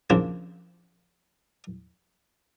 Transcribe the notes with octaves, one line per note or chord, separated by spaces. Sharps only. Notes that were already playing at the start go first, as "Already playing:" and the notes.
C#3 F3 A#3 C4 D4